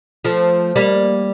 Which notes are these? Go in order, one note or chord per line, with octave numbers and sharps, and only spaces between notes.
F3 A3
G3 A#3